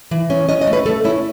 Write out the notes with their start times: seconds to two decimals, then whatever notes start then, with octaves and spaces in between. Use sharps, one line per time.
0.11 E3
0.30 C#4
0.49 C#4 D#5
0.61 D#5
0.67 A3
0.73 B4
0.86 A3 A4
1.04 C#4 E4